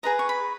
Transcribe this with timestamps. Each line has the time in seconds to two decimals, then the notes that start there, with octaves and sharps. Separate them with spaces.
0.03 G#4 B4 D#5 A#5
0.19 C#6
0.29 B5